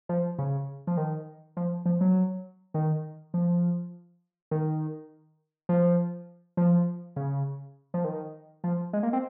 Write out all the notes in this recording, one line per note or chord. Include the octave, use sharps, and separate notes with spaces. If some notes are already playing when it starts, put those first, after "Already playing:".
F3
C#3
F3
D#3
F3
F3
F#3
D#3
F3
D#3
F3
F3
C#3
F3
D#3
F3
G#3
A#3
C4